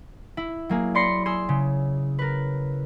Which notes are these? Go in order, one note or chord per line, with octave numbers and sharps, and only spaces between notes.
E4
F#3 A#3 G#4
D5 B5 C6 A#6 C7 C#7
G#4 C6 E6
C#3
A#4 B4